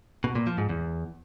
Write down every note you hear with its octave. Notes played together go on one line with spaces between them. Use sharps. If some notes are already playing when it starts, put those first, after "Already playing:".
B2
A#2
F3
G#2
E2